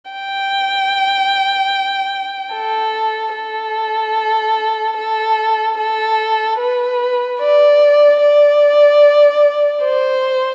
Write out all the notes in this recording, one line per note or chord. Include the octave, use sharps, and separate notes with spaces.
G5
A4
A4
A4
A4
B4
D5
D5
C5